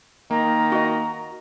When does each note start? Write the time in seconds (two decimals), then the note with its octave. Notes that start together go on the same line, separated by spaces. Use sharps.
0.31 D#3 A#3 A#5
0.72 F#4 D#5